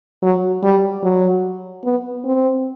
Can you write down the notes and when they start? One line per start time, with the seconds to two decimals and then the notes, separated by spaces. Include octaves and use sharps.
0.22 F#3
0.62 G3
1.03 F#3
1.84 B3
2.24 C4